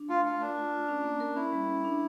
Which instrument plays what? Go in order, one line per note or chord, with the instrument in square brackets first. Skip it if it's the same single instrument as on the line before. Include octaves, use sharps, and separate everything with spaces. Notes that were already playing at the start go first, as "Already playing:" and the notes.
Already playing: [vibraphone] D4
[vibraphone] A3 [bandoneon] F4
[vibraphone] A3 [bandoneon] F4
[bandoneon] D4 [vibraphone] A#4
[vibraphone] F4
F4
C#4
A#3
A#4
[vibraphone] C#4 [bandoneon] E4
[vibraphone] G3
G3
D4